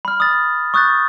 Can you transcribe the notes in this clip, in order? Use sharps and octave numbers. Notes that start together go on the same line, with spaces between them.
B5 F6
D#6 A6
C#6 D#6 F#6 G6 A6